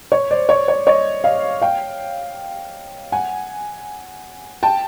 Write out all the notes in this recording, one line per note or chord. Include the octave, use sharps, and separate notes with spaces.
C#5
C5 D5
C#5
C#5
C#5 D#5
D#5 F5
F5 G5
F#5 G#5
G5 A5